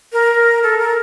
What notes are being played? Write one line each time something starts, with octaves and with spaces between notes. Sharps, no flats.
A#4
A4
A#4